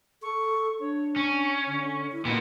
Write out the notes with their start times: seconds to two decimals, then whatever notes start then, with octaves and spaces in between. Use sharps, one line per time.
0.22 A4 C#6
0.80 D4 C#5
1.16 C#4 C#6
1.67 D3
2.12 E4
2.25 A#2 D#3 B3